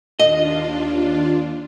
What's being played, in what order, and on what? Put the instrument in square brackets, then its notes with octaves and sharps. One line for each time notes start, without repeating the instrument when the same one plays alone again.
[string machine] D#2 D4 F4 [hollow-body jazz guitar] D#5